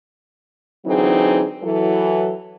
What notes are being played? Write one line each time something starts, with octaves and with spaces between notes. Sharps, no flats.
D3 E3 F#3 C4 D#4 G#4
E3 F#3 A4